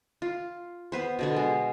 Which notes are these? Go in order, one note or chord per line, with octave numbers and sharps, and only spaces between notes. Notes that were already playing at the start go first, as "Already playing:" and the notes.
F4
B3 B4 C5
B2 D3 B3
G#3